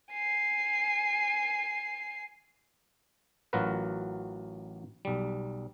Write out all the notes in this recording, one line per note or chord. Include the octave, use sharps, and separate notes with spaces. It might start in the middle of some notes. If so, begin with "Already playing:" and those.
G#5 C7
A1 F#3 F4 F#4 A#4 B4
B1 G3